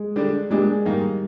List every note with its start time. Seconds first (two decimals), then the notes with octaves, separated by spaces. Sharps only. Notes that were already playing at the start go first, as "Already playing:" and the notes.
Already playing: G#3
0.16 D3 G3 D4
0.50 A#2 G3 G#3 D4 G4
0.85 G#2 D#3 G3 A#3 D#4